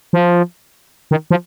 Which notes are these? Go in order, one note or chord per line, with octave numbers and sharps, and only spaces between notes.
F3
D#3
F3